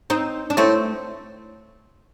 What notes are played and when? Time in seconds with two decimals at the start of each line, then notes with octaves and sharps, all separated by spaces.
0.10 C4 D#4
0.50 D4
0.57 A2 A3 C4